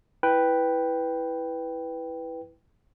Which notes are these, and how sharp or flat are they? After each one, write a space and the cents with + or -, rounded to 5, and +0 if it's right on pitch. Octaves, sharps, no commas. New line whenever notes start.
E4 +0 B4 +0 G5 +0